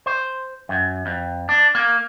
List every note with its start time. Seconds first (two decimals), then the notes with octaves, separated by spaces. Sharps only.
0.06 C5
0.69 F#2
1.06 F2
1.49 D4
1.75 A#3